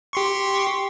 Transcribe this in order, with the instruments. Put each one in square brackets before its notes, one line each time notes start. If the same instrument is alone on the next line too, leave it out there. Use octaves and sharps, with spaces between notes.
[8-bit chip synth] G4 C6 C#6